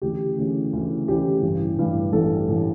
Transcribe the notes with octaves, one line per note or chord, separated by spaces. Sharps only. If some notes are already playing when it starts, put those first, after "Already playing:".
D2 C#3 E3 G4
D2 C#3 E3
D2 C#3 E3
D2 C#3 E3 G4
A1 G2 E3
A1 G2 E3
A1 G2 E3 A4
A1 E3